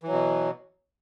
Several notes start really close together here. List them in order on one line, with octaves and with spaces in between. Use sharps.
E3 F#3 B2